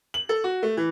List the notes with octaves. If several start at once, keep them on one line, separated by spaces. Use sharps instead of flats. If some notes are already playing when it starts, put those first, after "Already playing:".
F#7
A4
F#4
A3
E3